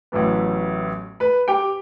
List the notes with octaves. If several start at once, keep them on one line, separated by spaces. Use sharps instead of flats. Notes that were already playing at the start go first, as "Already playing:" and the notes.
A1 A2 F#3 B3
B4 B5
G4 G5